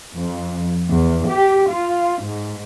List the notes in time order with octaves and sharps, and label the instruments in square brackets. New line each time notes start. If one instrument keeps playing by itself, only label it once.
[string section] F2
E2
G4
F4
G#2